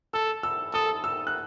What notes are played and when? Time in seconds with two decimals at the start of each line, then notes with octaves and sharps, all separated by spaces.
0.14 A4 E6
0.43 E6
0.73 A4 D#6
1.04 E6
1.27 F#6